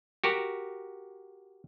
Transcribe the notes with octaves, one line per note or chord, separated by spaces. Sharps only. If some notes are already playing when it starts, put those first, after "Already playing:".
F#4 G4 A#4